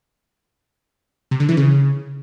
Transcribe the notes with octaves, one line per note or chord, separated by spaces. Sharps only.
C3
D3
E3
C#3